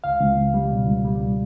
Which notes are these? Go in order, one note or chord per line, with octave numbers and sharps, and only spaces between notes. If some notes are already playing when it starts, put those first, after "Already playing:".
C#2 F5
C#2
C#2
G3
B2
C#2
G3
C#2